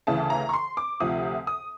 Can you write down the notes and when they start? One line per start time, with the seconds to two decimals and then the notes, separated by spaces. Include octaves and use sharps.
0.07 D2 C#3 E3 A5
0.30 A#5
0.49 C#6
0.54 C6
0.77 D6
1.00 D2 C3 F3 D#6
1.47 D#6